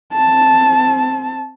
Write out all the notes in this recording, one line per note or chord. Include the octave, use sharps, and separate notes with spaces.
C4 A5